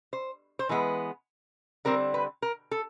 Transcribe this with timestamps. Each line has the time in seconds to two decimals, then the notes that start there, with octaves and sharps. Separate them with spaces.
0.13 C5
0.59 C5
0.69 E3 G#3 B3 B4
1.85 D3 G3 C4 A#4
2.14 B4
2.42 A#4
2.71 A4